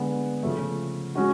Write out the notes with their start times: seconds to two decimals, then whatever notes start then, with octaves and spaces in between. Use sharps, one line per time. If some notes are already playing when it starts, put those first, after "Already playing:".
Already playing: D3 G#3 B3
0.43 C#3 F3 A3
1.15 G#3 C#4 F#4